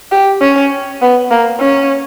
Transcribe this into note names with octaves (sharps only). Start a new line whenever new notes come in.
G4
C#4
B3
A#3
C#4